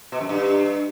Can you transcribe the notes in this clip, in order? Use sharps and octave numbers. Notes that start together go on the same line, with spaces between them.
B2
F#2
G2